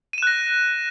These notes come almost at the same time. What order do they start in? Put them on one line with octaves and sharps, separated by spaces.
D#7 E7 F#6 A#6